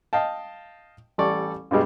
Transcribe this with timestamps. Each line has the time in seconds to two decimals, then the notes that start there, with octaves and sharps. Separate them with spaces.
0.13 D#5 F5 G5 A5
1.18 A1 G3 A4 D5 C#6
1.71 G2 B2 G3 G#3